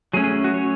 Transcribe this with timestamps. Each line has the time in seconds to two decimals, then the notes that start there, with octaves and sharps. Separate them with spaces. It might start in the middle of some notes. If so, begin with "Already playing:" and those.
0.13 F#3 A3 C#4 G#4
0.24 G#4
0.44 F#4
0.54 C#5